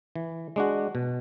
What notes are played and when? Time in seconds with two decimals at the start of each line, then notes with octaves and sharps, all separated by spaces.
0.15 E3
0.56 G#3 D4 F#4
0.95 B2